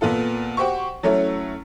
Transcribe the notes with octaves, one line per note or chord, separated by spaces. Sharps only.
A#2 B3 F4 A4
F#4 G4 C5 C#6
F#3 A3 C#4 E4 C#5